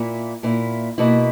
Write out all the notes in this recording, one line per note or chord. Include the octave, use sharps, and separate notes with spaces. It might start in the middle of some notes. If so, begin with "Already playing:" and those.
Already playing: A#2 A#3 E4
A#2 A#3 E4
B2 A#3 E4